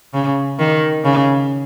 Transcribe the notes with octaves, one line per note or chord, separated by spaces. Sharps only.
C#3
D#3
C#3